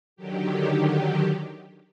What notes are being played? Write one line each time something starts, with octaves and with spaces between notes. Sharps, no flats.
D3 D#3 F#3 G4